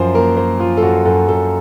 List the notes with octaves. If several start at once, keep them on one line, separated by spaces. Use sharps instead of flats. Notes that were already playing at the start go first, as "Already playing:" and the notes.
Already playing: F#2 F3 A#4 C5
A#3 A#4
A#3 C5
F3 F4
A4
F#2 F#4
F#2 A4
F#2 A4